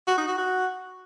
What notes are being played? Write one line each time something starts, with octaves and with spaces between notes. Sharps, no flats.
F#4
D#4
F#4
F#4